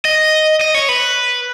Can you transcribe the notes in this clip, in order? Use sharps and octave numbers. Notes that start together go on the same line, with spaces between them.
D#5
D#5
C#5
B4